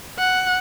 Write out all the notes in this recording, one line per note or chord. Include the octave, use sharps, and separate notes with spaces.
F#5